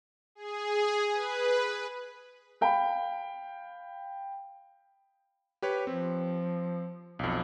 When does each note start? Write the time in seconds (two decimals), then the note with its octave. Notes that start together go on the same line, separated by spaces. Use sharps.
0.35 G#4
1.11 B4
2.61 F5 G5 B5
5.62 G4 B4 C#5
5.87 F3 C4
7.19 B1 F2